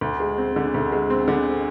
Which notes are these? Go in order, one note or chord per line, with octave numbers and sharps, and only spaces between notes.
D2
G#3
C4
D3
D2
G#3
C4
D3